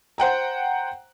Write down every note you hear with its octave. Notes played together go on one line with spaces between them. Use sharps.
C5 F#5 G5 A#5